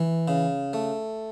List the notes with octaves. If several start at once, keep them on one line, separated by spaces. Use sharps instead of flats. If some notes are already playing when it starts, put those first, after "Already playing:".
Already playing: E3
C#3
A3